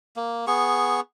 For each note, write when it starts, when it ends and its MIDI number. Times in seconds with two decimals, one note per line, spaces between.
0.16 0.46 58
0.47 1.00 59
0.47 1.00 68
0.47 1.00 85